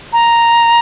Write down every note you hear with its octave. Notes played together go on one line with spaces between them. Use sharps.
A#5